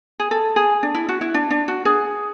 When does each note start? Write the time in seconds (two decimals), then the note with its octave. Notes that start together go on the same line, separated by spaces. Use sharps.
0.20 G#4
0.31 A4
0.56 G#4
0.83 D4
0.94 E4
1.09 F#4
1.21 E4
1.34 D4
1.51 D4
1.68 F#4
1.85 G#4